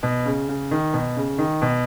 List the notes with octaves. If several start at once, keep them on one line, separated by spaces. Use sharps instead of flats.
B2
C#3
C#3
D#3
B2
C#3
D#3
B2